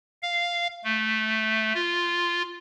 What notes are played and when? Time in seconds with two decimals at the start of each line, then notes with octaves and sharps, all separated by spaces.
0.23 F5
0.84 A3
1.75 F4